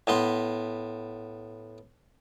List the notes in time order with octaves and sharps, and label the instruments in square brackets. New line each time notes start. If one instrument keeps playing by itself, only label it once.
[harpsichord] A2 B3 C6